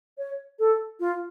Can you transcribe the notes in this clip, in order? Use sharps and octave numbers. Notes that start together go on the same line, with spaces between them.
C#5
A4
F4